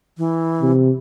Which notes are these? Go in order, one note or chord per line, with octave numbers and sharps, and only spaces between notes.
E3
C3